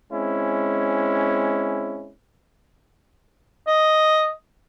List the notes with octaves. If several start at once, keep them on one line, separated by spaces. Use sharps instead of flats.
G#3 C4 C#4 E4
D#5